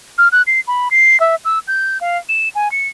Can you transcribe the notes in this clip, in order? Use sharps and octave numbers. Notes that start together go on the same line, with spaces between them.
F6
F#6
C7
B5
C7
E5
E6
G6
F5
E7
G#5
C#7